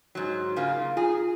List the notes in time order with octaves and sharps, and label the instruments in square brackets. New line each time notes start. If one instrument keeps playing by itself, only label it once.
[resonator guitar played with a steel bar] G#2 F#3
C#3 A#3 F4
[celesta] F4 [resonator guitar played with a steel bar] G#4